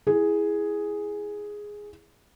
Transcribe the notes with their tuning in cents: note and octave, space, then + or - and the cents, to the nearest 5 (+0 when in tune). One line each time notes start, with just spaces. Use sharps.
E4 +0 G#4 +0